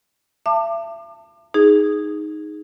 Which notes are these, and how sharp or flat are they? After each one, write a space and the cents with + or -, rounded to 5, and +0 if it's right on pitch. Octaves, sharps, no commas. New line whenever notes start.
E5 +35 A5 +30 D6 +35
D#4 +0 G#4 +0